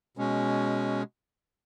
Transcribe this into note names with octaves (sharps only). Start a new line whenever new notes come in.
B2 G#3 C#4